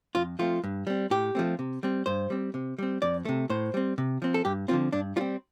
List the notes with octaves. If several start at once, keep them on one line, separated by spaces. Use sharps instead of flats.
F2 F4
F3 A3 C4 F4
G2
G3 C4
A2 G4
F3 A3 C4
C3
G3 C4
G2 C5
G3 C4
C3
G3 C4
F2 D5
C3 A3
A2 C5
G3 C4
C3
F3 C4
A4
G2 G4
D3 F3 C4 F4
G2 D4
G3 C4 F4